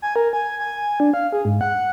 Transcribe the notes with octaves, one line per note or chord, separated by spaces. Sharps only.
G#5
A#4
G#5
G#5
D4
F5
G#4
G#2
F#5